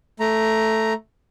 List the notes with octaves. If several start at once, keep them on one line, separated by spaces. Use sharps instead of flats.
A3 A#5